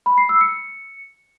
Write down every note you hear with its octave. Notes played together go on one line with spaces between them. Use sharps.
B5
C7
E6
C#7